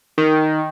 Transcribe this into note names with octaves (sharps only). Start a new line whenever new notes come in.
D#3